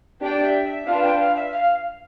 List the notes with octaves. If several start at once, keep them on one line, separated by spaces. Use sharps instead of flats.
D4 G4 D5 G5
E5
E5
D4 F4 B4 F5
G5
F5
E5
F5